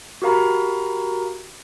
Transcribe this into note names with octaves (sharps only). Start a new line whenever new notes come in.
F#4 G4 A#4 F5 A#5 B5